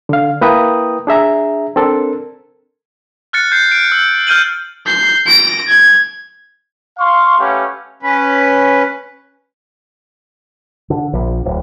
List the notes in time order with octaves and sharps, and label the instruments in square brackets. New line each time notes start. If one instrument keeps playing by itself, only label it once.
[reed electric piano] D3 F5
A#3 E4 B4 G5 A#5 D#6
D4 G#4 E5 A#5
C4 D4 A4 A#4
[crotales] F6 F#6 A6 C#7
G6 C7
D7
E6
F6 G6 D#7 F#7
[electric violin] G6 C7
A#6 D7
G#6
[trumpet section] F5 C6 C#6
A3 C#4 G4 B4 F5 F#5
[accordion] C#4 B4
[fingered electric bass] D3
A#1
D1